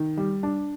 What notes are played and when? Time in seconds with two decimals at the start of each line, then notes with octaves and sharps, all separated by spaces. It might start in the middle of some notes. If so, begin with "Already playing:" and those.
Already playing: D#3
0.17 G3
0.43 D4